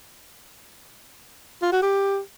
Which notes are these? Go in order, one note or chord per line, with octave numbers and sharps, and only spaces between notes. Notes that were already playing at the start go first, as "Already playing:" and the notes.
F4
F#4
G4